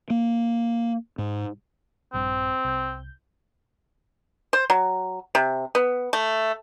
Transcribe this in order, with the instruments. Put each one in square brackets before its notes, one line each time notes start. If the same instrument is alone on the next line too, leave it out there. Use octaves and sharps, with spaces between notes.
[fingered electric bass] A#3
G#2
[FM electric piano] A#1 G2 [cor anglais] C4
[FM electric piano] C2 G6
[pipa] C5
F#3
C3
B3
A3